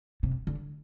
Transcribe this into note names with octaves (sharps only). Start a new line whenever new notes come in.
C3
D3